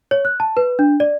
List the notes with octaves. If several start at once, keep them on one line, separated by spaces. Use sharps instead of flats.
C#5
F#6
A5
B4
D4
D5